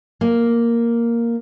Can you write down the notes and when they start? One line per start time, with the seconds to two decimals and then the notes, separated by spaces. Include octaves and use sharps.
0.21 A#3